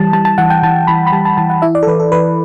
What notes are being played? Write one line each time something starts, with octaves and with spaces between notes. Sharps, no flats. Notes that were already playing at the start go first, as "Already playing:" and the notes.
Already playing: E3 G3 A5
G3 A5
A5
E3 F#5
G5
E3 A5
E3 B5
B5
G3 A5
A5
E3 A5
F#5
E4 E5
D5
A4
E3 B4
A4
E3 B4